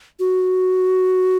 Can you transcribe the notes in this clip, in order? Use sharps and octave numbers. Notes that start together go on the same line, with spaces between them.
F#4